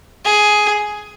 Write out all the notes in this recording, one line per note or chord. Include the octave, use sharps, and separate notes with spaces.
G#4